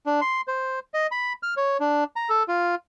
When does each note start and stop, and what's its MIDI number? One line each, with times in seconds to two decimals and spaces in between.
0.06 0.21 62
0.21 0.41 84
0.48 0.79 72
0.94 1.07 75
1.11 1.33 83
1.43 1.54 89
1.57 1.77 73
1.80 2.04 62
2.16 2.29 82
2.29 2.43 69
2.48 2.75 65